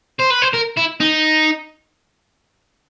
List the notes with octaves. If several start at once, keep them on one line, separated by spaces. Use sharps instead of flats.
C5
B4
C5
A#4
E4
D#4